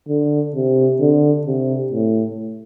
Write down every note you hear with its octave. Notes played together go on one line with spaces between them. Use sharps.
D3
C3
D3
C3
A2